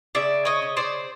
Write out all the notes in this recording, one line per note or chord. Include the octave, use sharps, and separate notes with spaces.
C#3 D5 E5
C#5 D#5
C#3
C5 D5